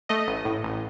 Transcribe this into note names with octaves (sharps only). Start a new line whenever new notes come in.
A3 D#5
A1
A2
A1